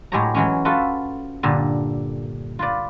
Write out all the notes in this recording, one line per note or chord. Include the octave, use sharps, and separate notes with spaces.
A2 F#3 G#3 G4 C#5 A#5
E3 F#3 G#3 C#4
F4 F#4 A4 B4 E5
G2 A#2 D3
F4 B4 D5